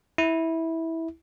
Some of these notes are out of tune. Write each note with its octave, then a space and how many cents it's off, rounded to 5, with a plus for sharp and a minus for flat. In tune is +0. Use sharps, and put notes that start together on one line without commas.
E4 -15